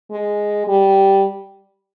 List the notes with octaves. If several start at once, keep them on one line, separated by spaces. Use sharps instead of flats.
G#3
G3